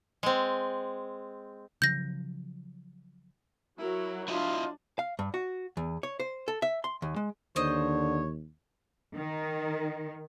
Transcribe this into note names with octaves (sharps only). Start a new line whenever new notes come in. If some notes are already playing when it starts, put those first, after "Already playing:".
G#3 C4
C#3 F3 F#3 G6 A#6
F#3 E4 A#4
D4 E4 F4 D#5
F5
G2
F#4
E2
C#5
C5
A4
E5
C6
D#2
G#3
D#2 D3 C5 C#5 D#5
D#3